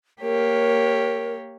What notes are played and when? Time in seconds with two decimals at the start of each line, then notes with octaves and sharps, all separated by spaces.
0.21 A#3 G4 A#4 C#5